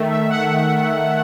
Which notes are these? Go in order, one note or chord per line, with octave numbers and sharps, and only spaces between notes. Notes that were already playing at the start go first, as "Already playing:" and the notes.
Already playing: D#3 A3
E5
F#5